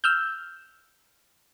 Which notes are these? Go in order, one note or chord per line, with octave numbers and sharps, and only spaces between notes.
E6 F6 G6